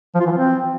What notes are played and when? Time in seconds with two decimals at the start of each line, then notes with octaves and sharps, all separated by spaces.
0.15 F3
0.20 F4
0.26 E3
0.32 F3
0.37 C4